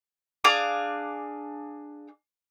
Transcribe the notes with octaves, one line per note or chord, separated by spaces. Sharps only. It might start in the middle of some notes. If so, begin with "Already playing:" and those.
D4 G#4 F5 D6